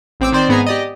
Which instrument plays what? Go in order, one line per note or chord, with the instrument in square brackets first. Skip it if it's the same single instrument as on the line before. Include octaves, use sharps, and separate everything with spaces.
[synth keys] A1 C4 D6 E6
D#3 C4 C5 D5
G#2 B3 G#4 G#5 A#5
G4 D5 D#5